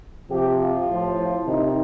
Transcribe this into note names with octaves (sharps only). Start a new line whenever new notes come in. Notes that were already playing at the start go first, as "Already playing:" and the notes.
C3 F3 G4
F4
A2 F3
C3 D#3 D#4